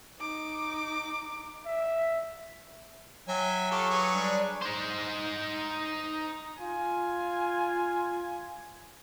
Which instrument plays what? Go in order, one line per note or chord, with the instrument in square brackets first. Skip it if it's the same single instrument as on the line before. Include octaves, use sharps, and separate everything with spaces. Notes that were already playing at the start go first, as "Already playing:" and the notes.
[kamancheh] D#4 D6
[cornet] E5
[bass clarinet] F#3 [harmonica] E5 G5 G#5
[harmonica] F4 G4 A4 [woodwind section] C#6 D6
[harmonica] G#4 B4 C#5
[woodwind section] G3 D4
[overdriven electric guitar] D#4 C5
[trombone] F4 [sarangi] G#5